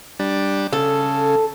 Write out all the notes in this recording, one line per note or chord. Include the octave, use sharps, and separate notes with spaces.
G3 D4
C#3 A4